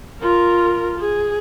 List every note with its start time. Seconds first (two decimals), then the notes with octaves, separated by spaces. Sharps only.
0.21 F4 A#4
0.99 G#4